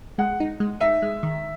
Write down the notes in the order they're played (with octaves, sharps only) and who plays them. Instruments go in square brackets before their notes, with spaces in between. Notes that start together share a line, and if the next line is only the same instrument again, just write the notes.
[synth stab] G#3 [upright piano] F#5
[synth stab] D#4
G#3
[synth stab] D#4 [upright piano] E5
[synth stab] G#3
D#3